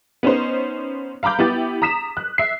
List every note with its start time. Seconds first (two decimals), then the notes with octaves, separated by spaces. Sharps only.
0.23 B3 C#4 D#4 C5
1.23 F5 A#5 B5 D6 G6
1.39 B3 E4 G4 A6
1.82 A#5 D#6 B6 E7
2.17 F#6
2.38 E5 C7